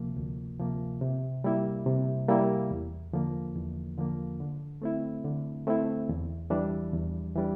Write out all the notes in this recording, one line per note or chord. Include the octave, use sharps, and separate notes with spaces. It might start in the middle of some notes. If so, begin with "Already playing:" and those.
Already playing: D2 C3 F3 A#3
D2
C3 F3 A#3
C3
G3 A#3 E4
C3
G3 A#3 E4
E2
D3 F3 A#3
E2
D3 F3 A#3
D3
A3 C4 E4
D3
A3 C4 E4
E2
E3 G3 D4
E2
E3 G3 D4